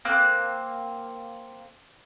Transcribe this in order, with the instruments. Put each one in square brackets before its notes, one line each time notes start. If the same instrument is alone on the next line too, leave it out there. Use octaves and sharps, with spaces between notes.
[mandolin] A#3 C4 F#6